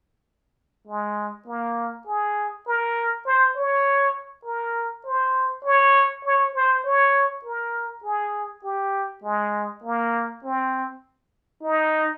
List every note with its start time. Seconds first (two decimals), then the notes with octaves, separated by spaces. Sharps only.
0.87 G#3
1.47 A#3
2.07 G#4
2.67 A#4
3.26 C5
3.56 C#5
4.46 A#4
5.06 C5
5.65 C#5
6.25 C#5
6.55 C5
6.85 C#5
7.45 A#4
8.04 G#4
8.64 G4
9.24 G#3
9.84 A#3
10.44 C4
11.63 D#4